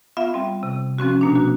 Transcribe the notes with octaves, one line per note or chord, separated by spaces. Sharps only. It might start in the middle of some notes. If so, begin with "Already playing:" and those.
B3 F4 E5 F5
G3 C4
C3
F3 C4 C#4 F#4
B2 A#3 D4
F#4